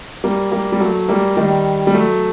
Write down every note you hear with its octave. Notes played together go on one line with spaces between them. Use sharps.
G3 A#3
G3 A#3
G3
F#3 A3
G3 A#3
D#3 G3
G3
F#3 A3